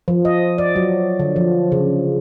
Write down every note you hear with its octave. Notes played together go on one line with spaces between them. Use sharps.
F3
D#5
D5
F#3
D3
F3
C#3